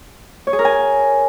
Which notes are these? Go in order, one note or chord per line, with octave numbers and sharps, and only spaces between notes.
C#5
G#4
A#4
G#5